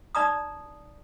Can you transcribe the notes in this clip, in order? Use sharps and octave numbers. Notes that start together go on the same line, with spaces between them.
D#4 D5 A#5 D#6